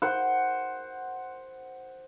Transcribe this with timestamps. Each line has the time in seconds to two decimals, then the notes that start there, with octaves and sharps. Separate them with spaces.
0.02 C5 F#5